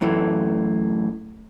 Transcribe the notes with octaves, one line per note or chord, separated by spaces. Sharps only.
F#2 A2 E3 A3